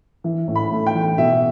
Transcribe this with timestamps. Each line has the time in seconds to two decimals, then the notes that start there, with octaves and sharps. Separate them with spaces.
0.24 E3
0.48 A2
0.55 B5
0.71 A3
0.87 G5
0.95 E3
1.18 B2 E5